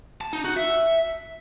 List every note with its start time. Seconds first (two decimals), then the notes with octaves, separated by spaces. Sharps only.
0.21 A5
0.33 D#4
0.45 F#4
0.57 E5